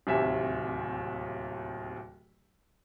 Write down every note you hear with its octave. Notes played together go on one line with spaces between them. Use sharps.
D1 D#2 C3 E5 G#5